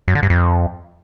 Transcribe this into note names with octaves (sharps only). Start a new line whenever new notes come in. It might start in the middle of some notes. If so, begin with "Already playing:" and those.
F#2
D3
G2
F2